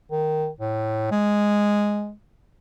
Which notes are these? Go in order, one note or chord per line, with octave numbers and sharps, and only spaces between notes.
D#3
A2
G#3